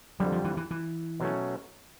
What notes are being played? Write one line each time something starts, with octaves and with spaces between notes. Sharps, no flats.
F2 D3 F#3 G3
F3
E3
E3
E3
B2 F#3 A3 C#4